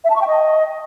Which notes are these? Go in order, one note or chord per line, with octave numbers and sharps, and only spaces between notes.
E5
A5
C#6
G5
D#5